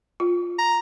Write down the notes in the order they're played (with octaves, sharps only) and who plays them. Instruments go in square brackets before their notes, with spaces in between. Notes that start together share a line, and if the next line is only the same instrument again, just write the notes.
[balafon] F4
[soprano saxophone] A#5